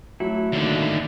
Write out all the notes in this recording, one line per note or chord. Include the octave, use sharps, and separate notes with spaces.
F#3 A3 E4
D#2 D3 A3 A#3 D5